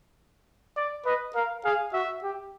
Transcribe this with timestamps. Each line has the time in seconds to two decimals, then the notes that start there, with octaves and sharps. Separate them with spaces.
0.76 D5
1.06 B4 D#5
1.35 A#4 F5
1.65 G#4 F5
1.93 F#4 E5
2.24 G4